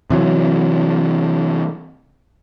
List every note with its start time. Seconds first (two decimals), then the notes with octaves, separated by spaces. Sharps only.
0.10 C3 E3 F#3